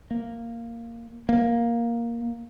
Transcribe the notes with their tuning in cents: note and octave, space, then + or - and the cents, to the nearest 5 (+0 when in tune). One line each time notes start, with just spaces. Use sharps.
A#3 -5
A#3 +5